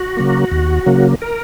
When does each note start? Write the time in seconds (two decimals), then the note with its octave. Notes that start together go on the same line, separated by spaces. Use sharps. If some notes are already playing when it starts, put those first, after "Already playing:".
Already playing: F#4
0.17 C#3 F#3 A#3
0.52 D#2
0.86 C#3 F#3 A#3
1.22 A#4